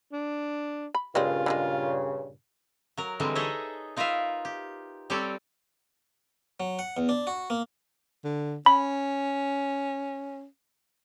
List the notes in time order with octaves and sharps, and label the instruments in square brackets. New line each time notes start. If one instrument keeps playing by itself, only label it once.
[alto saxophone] D4
[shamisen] B5
[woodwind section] G2 A#2 C#3 [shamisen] G3 G#3 C4 [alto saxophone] F4
[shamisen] D3 G3 G#3
[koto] F#3 A#4
D3 E3 G3 G#3 C4
D#4 G#4 A4 C#5 D#5 E5
D#4 F4 A#4 B4 E5 F5
G4
G3 C4 G4 A4 C#5 D5
[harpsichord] F#3
F#5
E2
D4
F#4
A#3
[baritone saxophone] D3
[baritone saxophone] C#4 [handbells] B5